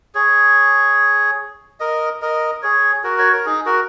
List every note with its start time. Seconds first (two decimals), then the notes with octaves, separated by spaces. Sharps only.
0.15 G#4 C#5
1.80 A#4 D#5
2.22 A#4 D#5
2.62 G#4 C#5
3.04 F#4 A#4
3.19 C#5
3.33 A#4
3.46 D#4 G#4
3.66 F#4 A#4